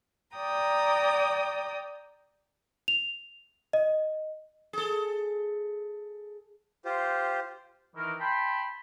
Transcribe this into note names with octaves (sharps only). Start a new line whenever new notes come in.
D5 G5 A#5 D#6
F7
D#5
G#4 A4
F4 G4 C5
D#3 E3 A#4
G5 A5 B5 C6